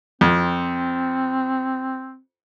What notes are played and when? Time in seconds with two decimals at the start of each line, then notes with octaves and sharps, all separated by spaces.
0.21 F2 C4